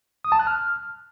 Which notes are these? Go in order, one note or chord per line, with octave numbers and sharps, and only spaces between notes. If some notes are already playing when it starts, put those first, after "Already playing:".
D#6
A5
F#6
F6